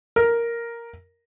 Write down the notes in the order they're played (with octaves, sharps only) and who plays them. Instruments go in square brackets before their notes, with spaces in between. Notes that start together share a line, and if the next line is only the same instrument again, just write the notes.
[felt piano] A#4